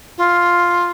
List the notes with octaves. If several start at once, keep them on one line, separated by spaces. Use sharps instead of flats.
F4